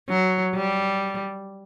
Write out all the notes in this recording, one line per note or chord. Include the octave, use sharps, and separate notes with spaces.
F#3
G3